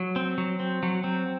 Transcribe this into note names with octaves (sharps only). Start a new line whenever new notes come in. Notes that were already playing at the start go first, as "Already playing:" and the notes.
Already playing: F#3
C4
F#3
C4
F#3
C4